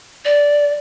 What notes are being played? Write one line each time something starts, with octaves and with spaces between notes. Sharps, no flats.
D5